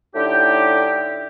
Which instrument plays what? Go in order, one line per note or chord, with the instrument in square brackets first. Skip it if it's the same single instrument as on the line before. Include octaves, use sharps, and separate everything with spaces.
[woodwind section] A2 D3 D#4 G4